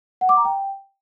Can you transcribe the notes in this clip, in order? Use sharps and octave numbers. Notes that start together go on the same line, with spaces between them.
F#5
D6
A#5
G5